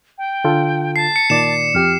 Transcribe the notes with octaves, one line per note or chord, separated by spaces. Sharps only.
G5
D3 F4 A4
A5 C7
C#7
A#2 D#3 D5 E7
F2 G4 F6